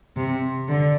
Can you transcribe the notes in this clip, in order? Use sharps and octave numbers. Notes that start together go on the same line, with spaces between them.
C3
D3